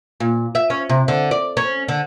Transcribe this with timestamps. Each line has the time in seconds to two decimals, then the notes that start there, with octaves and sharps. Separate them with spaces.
0.20 A#2
0.55 E5
0.70 C#4
0.89 C3
1.08 D3
1.31 D5
1.57 C#4
1.88 D3